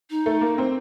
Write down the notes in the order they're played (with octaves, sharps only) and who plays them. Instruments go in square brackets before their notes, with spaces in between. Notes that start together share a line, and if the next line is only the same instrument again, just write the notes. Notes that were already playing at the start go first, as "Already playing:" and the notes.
[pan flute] D#4
[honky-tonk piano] A3
A#3
C4